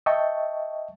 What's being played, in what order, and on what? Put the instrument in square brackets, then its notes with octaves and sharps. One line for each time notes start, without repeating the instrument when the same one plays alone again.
[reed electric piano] D#5 E5 G5 A5 C#6